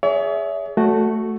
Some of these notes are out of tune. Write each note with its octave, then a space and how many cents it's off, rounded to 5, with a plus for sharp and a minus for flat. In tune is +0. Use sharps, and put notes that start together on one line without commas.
G#4 +5 C#5 +45 E5 +0
A3 +0 F#4 +0